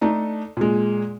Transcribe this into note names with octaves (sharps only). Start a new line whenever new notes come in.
A3 D4 D#4
A#2 G#3